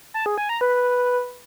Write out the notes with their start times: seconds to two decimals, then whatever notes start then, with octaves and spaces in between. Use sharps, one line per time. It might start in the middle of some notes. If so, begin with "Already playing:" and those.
0.14 A5
0.26 G#4
0.38 G#5
0.49 A#5
0.61 B4